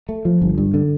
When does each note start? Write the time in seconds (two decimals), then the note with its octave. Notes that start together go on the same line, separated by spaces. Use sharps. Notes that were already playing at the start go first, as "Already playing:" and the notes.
0.09 A3
0.25 F3
0.42 G1
0.58 G2
0.74 D3